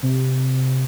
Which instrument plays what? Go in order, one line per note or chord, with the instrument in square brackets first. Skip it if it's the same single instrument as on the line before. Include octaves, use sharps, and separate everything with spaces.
[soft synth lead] C3